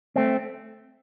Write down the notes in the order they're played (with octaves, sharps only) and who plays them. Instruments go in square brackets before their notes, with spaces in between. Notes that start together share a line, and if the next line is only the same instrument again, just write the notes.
[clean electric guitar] A3 C4